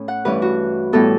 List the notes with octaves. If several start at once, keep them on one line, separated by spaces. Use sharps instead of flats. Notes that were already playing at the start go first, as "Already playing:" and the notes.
Already playing: A2 C#4
F#5
G2 E3 A3 C#4 B4
F#4
A2 E3 G3 B3 A4